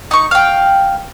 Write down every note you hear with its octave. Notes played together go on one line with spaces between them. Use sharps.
D#4 C#6
F5 G5